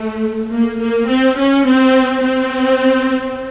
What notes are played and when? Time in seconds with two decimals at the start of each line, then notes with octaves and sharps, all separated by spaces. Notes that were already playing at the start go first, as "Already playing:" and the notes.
Already playing: A3
0.53 A#3
0.81 A#3
1.10 C4
1.39 C#4
1.67 C4
2.23 C4